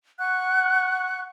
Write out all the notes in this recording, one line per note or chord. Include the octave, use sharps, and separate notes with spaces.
F#5 C#6 F#6